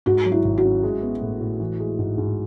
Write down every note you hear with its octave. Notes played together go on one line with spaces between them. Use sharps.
G#2 F#4
F#3
E4
G#1
F#4
C#4
G#3
B3
A2
A2
E3
G#3
G#2
G#2